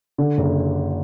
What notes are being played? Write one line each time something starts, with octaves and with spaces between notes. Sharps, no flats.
D3
F#1